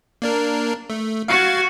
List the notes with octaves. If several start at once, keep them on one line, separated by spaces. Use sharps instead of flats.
A#3 D4 A#4
A3
F#4 F5 G#6 A6